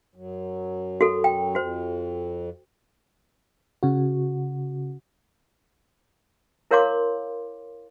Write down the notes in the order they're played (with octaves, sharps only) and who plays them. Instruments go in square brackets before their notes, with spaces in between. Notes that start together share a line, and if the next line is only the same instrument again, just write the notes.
[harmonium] F#2 F#3
[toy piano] F#4 A4
G5
[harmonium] F2 [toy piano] F#4 C5
[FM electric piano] C#3 F#4
[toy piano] E4 A#4 C#5 F5 C6 D6